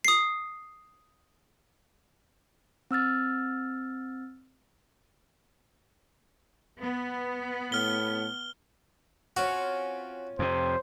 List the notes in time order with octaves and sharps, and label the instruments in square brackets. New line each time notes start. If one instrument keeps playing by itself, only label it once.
[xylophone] D#6 C7
[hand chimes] C4 E6 F6 A6
[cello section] B3
[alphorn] A2 [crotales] F6 G7
[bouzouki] C4 C#4 F4 [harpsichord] F#4
[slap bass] F2 C3 [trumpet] C5